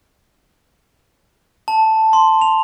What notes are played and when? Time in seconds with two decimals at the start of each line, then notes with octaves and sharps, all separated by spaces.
1.68 A5
2.13 C6
2.42 F7